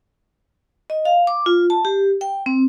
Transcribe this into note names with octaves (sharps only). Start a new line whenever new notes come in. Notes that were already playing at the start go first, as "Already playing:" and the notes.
D#5
F5
D6
F4
A5
G4
G5
C4